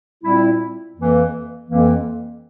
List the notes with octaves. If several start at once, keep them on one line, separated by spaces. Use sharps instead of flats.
A#2 G3 C4 E4
F2 E3 A#3
F2 E3 A#3